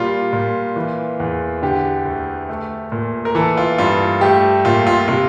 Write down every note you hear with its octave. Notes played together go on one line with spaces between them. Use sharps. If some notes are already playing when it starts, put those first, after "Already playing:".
Already playing: A#2 G3 F4
A#2
E3
E2
D3 G4
D2
A3
A#2
A#4
E3 A4
F4
G2 F4
A3 G4
A#2 F4
F4
C3 F4